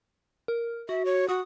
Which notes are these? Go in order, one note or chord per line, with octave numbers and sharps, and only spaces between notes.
A#4
F#4 E5
C#5
F#4 D#6